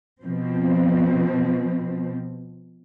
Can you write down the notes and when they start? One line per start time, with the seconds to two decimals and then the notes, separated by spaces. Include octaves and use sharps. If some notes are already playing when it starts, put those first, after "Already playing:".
0.23 B2 F3 C4